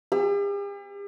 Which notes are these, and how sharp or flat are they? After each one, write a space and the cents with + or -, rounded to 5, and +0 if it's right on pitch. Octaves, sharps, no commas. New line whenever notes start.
G4 +45 E6 +35